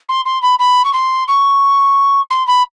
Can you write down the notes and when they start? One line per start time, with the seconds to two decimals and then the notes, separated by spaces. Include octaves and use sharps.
0.09 C6
0.25 C6
0.42 B5
0.59 B5
0.84 C#6
0.93 C6
1.28 C#6
2.30 C6
2.47 B5